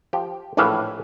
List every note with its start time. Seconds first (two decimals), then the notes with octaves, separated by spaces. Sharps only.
0.13 F3 G4
0.57 A#1 A2 E3 B4 F5